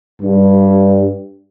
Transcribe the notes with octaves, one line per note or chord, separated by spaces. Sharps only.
G2